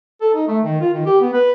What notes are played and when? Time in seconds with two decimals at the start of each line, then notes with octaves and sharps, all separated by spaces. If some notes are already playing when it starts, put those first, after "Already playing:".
0.21 A4
0.34 D#4
0.48 A3
0.64 D#3
0.81 F4
0.94 D#3
1.06 G4
1.21 B3
1.33 B4